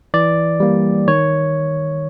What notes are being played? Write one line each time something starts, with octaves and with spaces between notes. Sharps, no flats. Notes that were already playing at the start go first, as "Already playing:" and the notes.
E3 D5
G3 A#3
D#3 C#5